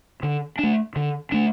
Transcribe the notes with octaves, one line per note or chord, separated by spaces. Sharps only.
D3
A3 D4
D3
A3 D4